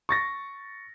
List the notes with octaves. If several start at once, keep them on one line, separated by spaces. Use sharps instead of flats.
C#6 A6 A#6